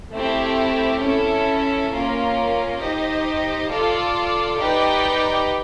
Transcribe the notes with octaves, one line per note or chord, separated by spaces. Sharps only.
A3 C4 E4 G4
C#4 E4 A4
A#3 C#4 F4 A#4
D#4 G4 C5 D#5
F4 A4 D5
D#4 G4 B4 D5 G5